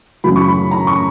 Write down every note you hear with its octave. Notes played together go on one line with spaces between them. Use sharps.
F#2 C#3 F#3 B5
C#6
B5
A#5
C#6